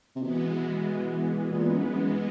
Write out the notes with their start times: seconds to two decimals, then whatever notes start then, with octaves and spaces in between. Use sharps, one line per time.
0.16 C3
0.21 B2 E3 G#3 B3
1.32 B2 E3 G#3 B3
1.50 A#2
1.69 F#2
1.81 F2
1.88 F#2